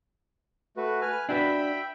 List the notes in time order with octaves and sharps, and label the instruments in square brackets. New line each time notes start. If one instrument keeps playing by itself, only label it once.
[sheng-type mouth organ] A3 F#4 B4
B4 G#5 F6
[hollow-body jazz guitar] D4 F#4 B4 [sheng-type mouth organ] E5 G5 B5